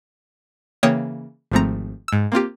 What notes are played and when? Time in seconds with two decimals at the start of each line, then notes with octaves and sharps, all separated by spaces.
0.83 C#3 E3 A#3 C#5 G5 D#6
1.51 G#1 G#2 F3 A3 C4 A#5
2.08 G#2 E6
2.32 A#3 C4 F4 G4